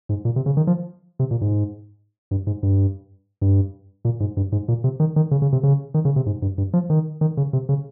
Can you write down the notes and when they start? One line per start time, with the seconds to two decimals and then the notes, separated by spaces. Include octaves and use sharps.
0.09 G#2
0.25 A#2
0.36 C3
0.46 C#3
0.57 D#3
0.67 F3
1.20 C3
1.31 A#2
1.41 G#2
2.31 G2
2.47 G#2
2.63 G2
3.42 G2
4.05 A#2
4.20 G#2
4.37 G2
4.52 G#2
4.68 A#2
4.84 C3
5.00 D#3
5.16 D#3
5.31 C#3
5.42 C#3
5.53 C3
5.63 C#3
5.94 D#3
6.05 C#3
6.16 C3
6.26 G#2
6.42 G2
6.58 G2
6.73 F3
6.90 D#3
7.21 D#3
7.37 C#3
7.53 C3
7.69 C#3